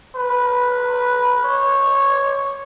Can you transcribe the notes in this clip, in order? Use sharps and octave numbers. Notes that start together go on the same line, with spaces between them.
B4
C#5